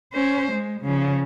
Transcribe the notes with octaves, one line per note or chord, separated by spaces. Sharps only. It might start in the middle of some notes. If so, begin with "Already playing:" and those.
C#4 C5
G#3
C#3 F3